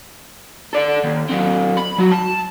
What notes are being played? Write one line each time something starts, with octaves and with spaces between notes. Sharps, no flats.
A4 D5
D#2
F#3 C4
B5
F#3 F#4
A5